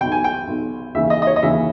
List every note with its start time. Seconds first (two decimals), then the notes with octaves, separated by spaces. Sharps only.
0.01 B1 B2 G5
0.12 G#5
0.24 G5
0.48 B1 B2
0.94 D#2 C#3 E3 E5
1.10 D#5
1.22 D#5
1.27 C#5
1.36 D#5
1.43 D#2 C#3 E3 E5